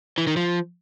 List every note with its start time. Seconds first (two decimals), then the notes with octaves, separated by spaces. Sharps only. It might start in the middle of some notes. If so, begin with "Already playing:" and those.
0.18 E3
0.27 D#3
0.37 F3